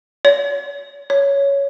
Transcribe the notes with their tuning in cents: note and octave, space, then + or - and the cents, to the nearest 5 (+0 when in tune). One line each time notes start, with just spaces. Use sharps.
C#5 +40
C#5 +10